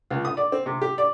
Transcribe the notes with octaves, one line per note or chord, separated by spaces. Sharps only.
C#2
D#6
D5
C4
C3
G4
D5